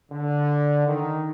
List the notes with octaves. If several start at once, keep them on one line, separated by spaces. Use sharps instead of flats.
D3
D#3